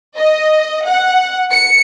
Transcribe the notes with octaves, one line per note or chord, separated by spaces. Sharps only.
D#5
F#5
C#7